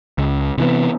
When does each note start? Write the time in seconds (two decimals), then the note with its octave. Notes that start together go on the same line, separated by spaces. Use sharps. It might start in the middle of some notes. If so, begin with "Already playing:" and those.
0.18 C#2
0.58 C3 E3 B3